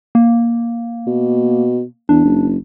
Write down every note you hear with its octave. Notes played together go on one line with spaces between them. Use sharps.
A#3
B2
E2 D4
F#1